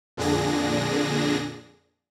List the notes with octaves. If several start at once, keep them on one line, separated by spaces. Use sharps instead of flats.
F2 A#2 D3 D4 G#4 A#6